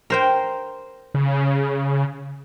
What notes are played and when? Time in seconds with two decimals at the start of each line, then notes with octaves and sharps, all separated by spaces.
0.10 A#4 C5 G5
1.14 C#3